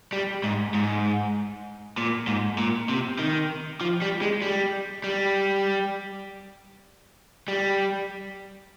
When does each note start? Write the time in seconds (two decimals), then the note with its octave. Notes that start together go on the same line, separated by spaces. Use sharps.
0.13 G3
0.44 G#2
0.75 G#2
1.97 A#2
2.27 G#2
2.58 A#2
2.89 C3
3.19 D#3
3.81 F3
4.02 G3
4.22 G#3
4.42 G3
5.04 G3
7.48 G3